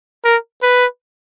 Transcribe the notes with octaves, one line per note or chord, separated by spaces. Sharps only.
A#4
B4